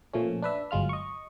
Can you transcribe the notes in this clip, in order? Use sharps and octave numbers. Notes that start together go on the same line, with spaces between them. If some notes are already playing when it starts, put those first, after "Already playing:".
A#2 F3 A3 C#4
D4 B4 E5
G1 F#3 G#3 F4 F6
D#5 C#6